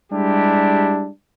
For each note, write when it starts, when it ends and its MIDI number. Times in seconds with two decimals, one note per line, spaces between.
0.12 1.10 55
0.12 1.10 56
0.12 1.10 62
0.12 1.10 64
0.12 1.10 67